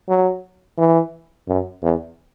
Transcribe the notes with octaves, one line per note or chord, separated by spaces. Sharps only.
F#3
E3
F#2
E2